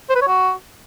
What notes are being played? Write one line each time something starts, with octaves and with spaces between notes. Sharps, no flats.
C5
B4
C#5
F#4